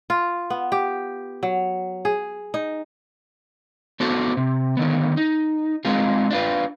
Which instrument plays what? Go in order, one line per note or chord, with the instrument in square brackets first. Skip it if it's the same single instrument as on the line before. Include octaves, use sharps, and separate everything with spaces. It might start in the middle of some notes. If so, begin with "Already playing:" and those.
[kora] F4
B3
G4
F#3
G#4
D#4
[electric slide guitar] B3 D4 F#4 A4 C5
C3
D3 D#3 B3
D#4
G#3 C4 D#4 F4 G#4
D4 F4 B4